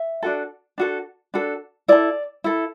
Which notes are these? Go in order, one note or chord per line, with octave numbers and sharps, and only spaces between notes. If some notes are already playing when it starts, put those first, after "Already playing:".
Already playing: E5
D4 F#4 A4
D4 F#4 A4
D4 F#4 A4
E4 A4 D5
E4 A4